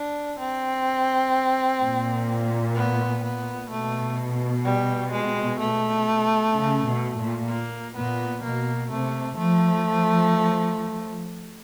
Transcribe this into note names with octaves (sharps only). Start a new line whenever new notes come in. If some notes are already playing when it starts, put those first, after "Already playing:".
Already playing: D4
C4
A#2
B3
B3
B2 A3
G3
G#3
A3
C#3
B2
A#2
A#3
A#2 B3
B2 A#3
C3 A3
F3 A3